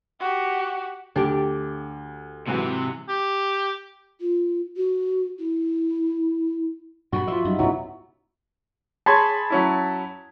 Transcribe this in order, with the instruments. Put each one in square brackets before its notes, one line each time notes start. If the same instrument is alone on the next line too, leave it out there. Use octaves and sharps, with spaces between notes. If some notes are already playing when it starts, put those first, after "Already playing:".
[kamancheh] F#4 G4
[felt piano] D2 [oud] D4 G4
[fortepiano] G#2 E3 F#3 [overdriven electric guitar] C3
[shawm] G4
[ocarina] F4
F#4
E4
[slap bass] G2 A#2 G3 [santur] F#4 B5
[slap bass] F3 [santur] F4 E5
[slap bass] F#2 [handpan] G3 D#4 F#4
[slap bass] C2 G#2 C#3 [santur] F#3 B3 [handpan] C#4 D#4 E4
[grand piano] G#4 C#5 C6 [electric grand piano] A5 B5 G#6
[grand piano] F#3 C#4 E4